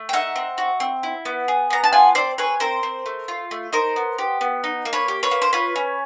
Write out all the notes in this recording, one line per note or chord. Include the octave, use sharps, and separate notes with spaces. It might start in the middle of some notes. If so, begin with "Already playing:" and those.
Already playing: A3
G5
D#4 E5 F#5
C4
F#4
C4
E4
B3
G#4
B3 A#5
A5
F4 F#5 G#5
C4 C5 D5
G#4 B4 C#5
C4 A#4 C5
C4
A3
F4
A3
D#4 A#4 C5
B3
G4
B3
D#4
A#3
B4 C#5
G4
B4 C#5
A#3
C5
F4 B4 C#5
C#4